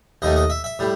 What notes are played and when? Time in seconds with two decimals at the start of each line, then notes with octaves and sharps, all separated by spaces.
0.22 D#2 D#3 A3 D#5
0.36 D#5
0.50 E5
0.64 E5
0.79 A2 G3